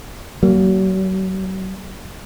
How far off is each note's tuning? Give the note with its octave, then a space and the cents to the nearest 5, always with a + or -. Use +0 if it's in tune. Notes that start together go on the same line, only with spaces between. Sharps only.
F#3 +40 A#3 +0